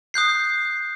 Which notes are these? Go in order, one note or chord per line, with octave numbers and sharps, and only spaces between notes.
D#6 F#6 G6 C7